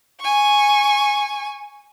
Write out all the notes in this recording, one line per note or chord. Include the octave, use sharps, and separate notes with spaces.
G#5 C#6